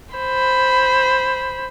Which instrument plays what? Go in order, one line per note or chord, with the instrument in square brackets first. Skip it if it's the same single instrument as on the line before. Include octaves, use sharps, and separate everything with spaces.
[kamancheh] C5 B5